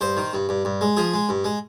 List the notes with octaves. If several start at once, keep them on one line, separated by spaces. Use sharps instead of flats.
G2 C5
D#3
G2
G2
G2
G#3
F3 G#4
G#3
G2
G#3